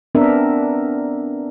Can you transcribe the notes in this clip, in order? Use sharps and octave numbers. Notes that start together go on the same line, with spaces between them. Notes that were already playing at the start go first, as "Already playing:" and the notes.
B3 C4 D4 A#4 E5